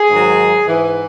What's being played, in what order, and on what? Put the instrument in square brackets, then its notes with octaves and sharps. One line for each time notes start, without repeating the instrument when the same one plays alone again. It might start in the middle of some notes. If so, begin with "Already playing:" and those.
Already playing: [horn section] G#4
G#2 D#3 F#3
G#2 E3